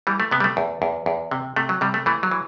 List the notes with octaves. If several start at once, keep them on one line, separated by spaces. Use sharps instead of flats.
E3 G3
A3
C3 B3
G3
A3
E2
E2
E2
C3
C3 A3
F#3
C3 G3
A3
E3 A3
F#3
E3